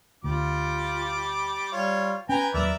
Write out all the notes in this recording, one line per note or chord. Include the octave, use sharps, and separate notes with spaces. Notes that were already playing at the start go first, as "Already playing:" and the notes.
D2 G3 F4 D6
G3 F4 C#5
C#4 B4 G5 G#5 A#5
D#2 F#3 A#4 D5 E5